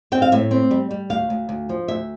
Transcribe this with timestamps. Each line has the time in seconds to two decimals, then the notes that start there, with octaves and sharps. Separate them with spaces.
0.12 C4 G5
0.22 F5
0.32 A2 E5
0.51 C4
0.71 G3
0.91 G3
1.10 D2 F5
1.30 D2
1.49 D2
1.69 F3
1.88 D2 E5